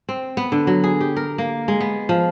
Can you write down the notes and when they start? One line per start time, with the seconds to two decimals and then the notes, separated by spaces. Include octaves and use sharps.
0.09 C4
0.37 B3
0.52 D3
0.67 F#3
0.84 G#4
1.01 G4
1.16 A#4
1.38 A#3
1.68 G#3
1.80 B3
2.09 F3